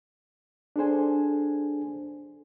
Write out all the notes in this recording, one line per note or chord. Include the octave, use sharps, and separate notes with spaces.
D4 G#4 A4 C5 G#5